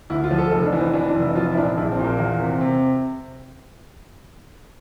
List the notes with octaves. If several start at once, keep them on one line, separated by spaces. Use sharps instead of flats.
D2 E4
F4
F3
A4
F1 A4
D4
E3
C4
E3 D4
D4
F1
E4
F3 F4
E4
A#2 D4
A#1 E4
C4
A#2
A#3
E2
C3
C3